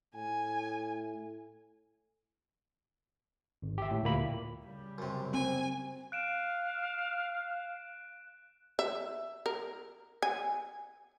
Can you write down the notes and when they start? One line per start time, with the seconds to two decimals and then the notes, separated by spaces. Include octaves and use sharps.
0.15 A2 G#5
3.62 G#1
3.78 G4 E5
3.91 A2
4.03 D2 A#2 A#3 B5
4.63 C#3 G3
4.98 F#2 C3
5.34 C4 G#5
6.12 F5 F#6 D7 E7
8.79 E5
9.46 A#4
10.22 G#5